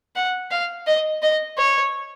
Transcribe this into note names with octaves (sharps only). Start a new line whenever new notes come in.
F#5
F5
D#5
D#5
C#5